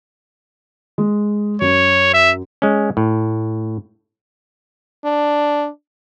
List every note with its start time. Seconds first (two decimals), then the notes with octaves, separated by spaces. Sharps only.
0.98 G#3
1.61 F#2 C#5
2.14 E5
2.62 G#3 C#4
2.97 A2
5.04 D4